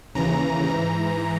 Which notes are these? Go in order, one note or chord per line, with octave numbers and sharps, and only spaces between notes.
D#2 C#3 E3 A#5
G#2 E3